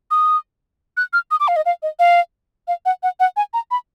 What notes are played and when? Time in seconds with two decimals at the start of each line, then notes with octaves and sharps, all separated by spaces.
0.11 D#6
0.97 F#6
1.13 F6
1.31 D#6
1.40 D6
1.48 F5
1.56 D#5
1.66 F5
1.83 D#5
1.99 F5
2.68 F5
2.85 F#5
3.03 F#5
3.20 F#5
3.37 G#5
3.53 A#5
3.71 B5